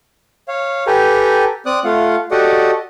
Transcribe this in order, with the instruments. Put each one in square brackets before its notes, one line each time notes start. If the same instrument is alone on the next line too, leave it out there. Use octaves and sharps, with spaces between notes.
[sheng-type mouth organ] C#5 F5
G4 A4 B4 G5 G#5 A#5
C4 D5 D#6 F#6
A3 F4 F5 F#5
F#4 G4 A4 D5 D#5 F#5